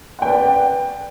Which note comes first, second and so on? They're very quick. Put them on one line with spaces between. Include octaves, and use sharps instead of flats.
F#5 G5 B4 D5